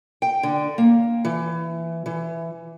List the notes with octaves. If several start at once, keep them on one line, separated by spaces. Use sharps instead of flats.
G5
D3
A#3
E3
E3